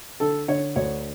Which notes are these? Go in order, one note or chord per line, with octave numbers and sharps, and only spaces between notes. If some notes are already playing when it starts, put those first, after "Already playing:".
D3 A4
D3 C#5
D2 C#5